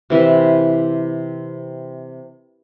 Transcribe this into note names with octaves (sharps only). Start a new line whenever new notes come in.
C3 E3 E5